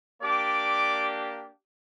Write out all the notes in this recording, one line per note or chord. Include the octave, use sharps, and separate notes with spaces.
A#3 D4 G4 D5 D6